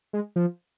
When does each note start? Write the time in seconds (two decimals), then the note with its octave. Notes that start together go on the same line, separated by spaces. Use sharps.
0.13 G#3
0.36 F3